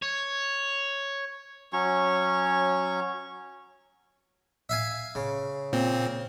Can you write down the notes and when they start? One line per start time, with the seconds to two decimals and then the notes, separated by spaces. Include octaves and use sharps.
0.02 C#5
1.73 F#3 C#4 C#5 C#6
4.69 E5 F5 G#5
5.15 C#3
5.73 A#2 C4